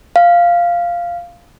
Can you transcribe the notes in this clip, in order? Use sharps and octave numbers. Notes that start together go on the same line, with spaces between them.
F5